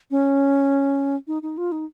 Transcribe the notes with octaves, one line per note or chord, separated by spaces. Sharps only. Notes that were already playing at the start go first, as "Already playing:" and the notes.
C#4
D#4
D#4
F4
D#4